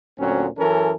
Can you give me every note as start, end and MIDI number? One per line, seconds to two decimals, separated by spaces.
0.17 0.47 38
0.17 0.47 46
0.17 0.47 54
0.17 0.47 60
0.17 0.47 61
0.58 0.93 42
0.58 0.93 52
0.58 0.93 61
0.58 0.93 69
0.58 0.93 70